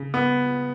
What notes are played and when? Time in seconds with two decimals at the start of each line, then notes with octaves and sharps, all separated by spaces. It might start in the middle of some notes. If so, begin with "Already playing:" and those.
Already playing: C#3
0.14 B3